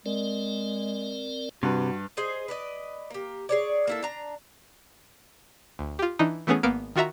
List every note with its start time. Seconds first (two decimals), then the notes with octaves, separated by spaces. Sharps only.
0.06 G#3 C4 A#4 D5
1.63 G2 C3 F#4 B4
2.17 G#4 C5 D#5
2.48 B4 D5 D#5
3.10 A#3 G4
3.49 G#4 C#5 D5
3.87 A#3 E4 A4
4.03 D4 A#5
5.79 D2
5.99 F4 G4
6.19 E3 D4 D#4
6.47 E3 A3 B3 C#4 G#4
6.63 G#1 A#3 B3 F5 C#7 D7
6.96 D#3 F4 F#4 E5 A#5